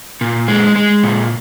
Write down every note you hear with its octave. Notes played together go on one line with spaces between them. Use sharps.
A#2
G#3
G#3
A#2